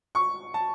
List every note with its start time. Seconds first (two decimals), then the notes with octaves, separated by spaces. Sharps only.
0.15 C#6
0.54 A5